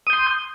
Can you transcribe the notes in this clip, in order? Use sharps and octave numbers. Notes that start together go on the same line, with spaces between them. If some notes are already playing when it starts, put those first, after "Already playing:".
C6 D#6 G6